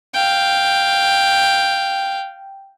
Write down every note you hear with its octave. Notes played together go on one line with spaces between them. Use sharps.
F5 G5